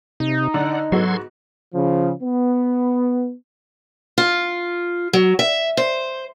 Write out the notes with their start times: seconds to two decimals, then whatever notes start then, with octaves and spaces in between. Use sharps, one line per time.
0.20 C3 D#4
0.54 D3 D5 F#5
0.92 G#2 F#3 B3 F#4 A4 C6 G#6
1.74 C#3 F3
2.23 B3
4.18 F4
5.13 F#3
5.39 E5
5.77 C5